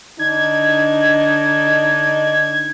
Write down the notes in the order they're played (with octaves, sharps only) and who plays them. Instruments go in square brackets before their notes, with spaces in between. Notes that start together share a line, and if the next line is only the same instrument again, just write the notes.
[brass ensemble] D3 D4 D#4 [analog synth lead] G#6